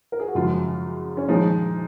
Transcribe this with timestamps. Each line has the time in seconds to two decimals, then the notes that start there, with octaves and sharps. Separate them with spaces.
0.12 A#4
0.20 G#4
0.28 F#4
0.35 F#2 C#3 F3 G#3 F4
1.17 C#4
1.28 A#2 F3 G#3 D#4